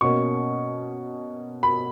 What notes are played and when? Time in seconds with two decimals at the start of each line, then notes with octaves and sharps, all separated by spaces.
0.01 B2 A#3 C#4 C#6
1.63 B5